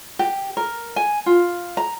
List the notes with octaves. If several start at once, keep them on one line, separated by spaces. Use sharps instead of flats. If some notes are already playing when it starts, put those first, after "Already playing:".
G4
A#4
G#5
F4
A#5